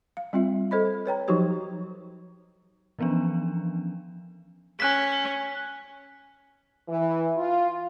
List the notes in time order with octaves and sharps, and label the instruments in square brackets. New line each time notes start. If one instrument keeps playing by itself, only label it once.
[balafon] F5
G3 C4 F4 E5
A4 C5 D#5 B5
B4 C#5 G5 A#5
F3 F#3 D#4 F#4 G4 C5
[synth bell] E3 F3 B3 C#4 D4
[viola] C#4 [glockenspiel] G#5 F#6 B6
[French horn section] E3
F4